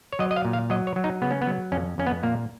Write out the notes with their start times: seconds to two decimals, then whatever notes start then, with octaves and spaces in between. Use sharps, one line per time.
0.13 C#5
0.19 F#3 D#5
0.31 D#5
0.36 F5
0.45 A#2
0.53 F5
0.70 F#3 D#5
0.87 C#5
0.96 F#3
1.04 D#4
1.22 C#3 B3
1.31 C#4
1.42 B3
1.47 F#3
1.72 F2 C#4
1.98 F2 C#4
2.06 B3
2.23 A#2 A#3